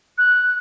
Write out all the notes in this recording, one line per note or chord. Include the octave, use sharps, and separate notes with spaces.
F#6